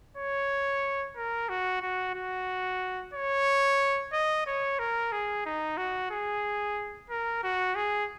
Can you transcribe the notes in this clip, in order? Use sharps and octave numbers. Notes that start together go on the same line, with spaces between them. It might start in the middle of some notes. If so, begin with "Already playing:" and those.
C#5
A#4
F#4
F#4
F#4
C#5
D#5
C#5
A#4
G#4
D#4
F#4
G#4
A#4
F#4
G#4